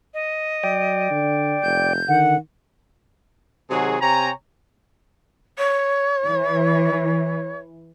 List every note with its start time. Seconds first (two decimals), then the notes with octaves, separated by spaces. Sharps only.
0.14 D#5
0.63 F#3 D5 G5
1.11 D3
1.62 F1 G6
2.08 D3 D#3 F#5
3.71 C3 D#3 F#3 F#4 G#4
4.01 C3 C#5 G5 G#5 A#5
5.58 C#5
6.25 E3